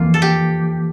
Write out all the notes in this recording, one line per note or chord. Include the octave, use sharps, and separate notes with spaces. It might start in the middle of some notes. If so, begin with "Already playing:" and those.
Already playing: F2 E3 A#3 F4
A4
G4